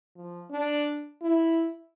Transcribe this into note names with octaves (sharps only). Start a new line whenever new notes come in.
F3
D4
E4